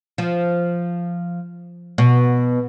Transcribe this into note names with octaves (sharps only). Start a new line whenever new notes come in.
F3
B2